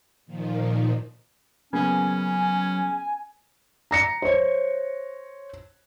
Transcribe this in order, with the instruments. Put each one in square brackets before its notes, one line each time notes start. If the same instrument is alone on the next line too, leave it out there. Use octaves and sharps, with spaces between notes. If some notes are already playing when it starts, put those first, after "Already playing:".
[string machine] A#2 D#3 F3
[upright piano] C#3 A#3 B3 [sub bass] F#3 [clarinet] C#4 [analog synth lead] G#5
[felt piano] A#5 A#6 C#7
C5 C#5